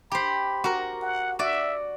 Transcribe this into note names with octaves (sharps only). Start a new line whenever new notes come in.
G4 C5 B5
F#4 A#4
F#5
F#4 D5 E5